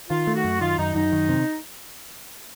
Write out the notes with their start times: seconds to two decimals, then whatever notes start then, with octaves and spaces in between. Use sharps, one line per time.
0.10 D#3 F4
0.27 A3
0.35 F#4
0.44 F#2
0.61 D#3 F4
0.78 F#2 D#4
0.95 F#2 D#4
1.12 D#3
1.29 C3